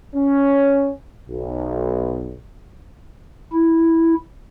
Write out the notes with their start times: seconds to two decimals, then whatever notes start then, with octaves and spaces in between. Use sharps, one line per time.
0.16 C#4
1.29 B1
3.53 E4